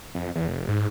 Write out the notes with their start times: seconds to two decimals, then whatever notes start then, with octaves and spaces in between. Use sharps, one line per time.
0.15 F2
0.35 E2
0.48 F1
0.69 G#2